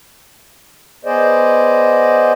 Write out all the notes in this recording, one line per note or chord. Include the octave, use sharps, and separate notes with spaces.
B3 G#4 C5 D5 D#5